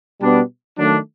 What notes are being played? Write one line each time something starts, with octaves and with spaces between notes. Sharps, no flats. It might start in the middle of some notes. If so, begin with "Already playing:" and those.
B2 G3 B3 D4
D#3 F#3 A3 D4